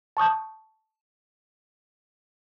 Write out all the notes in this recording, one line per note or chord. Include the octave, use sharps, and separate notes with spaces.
A5 C#6 D#6 G6